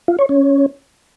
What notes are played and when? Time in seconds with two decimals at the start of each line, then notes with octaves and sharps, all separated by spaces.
0.08 F4
0.19 C#5
0.29 C#4